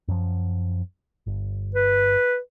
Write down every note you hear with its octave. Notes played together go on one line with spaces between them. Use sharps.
F#2 F3
G1
B4